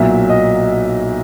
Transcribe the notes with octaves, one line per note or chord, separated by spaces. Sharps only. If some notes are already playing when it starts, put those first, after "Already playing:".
Already playing: B1 A#2 F#3 E5
D#5